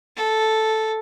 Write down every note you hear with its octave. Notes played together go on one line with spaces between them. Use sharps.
A4